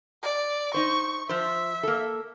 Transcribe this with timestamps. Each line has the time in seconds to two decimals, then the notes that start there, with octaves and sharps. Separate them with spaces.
0.23 D5
0.74 D#4 C5 C#6
1.29 F3 C5 E5
1.83 A#3 A4